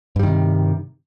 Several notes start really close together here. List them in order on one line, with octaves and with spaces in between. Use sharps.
G2 G3 D#3 C3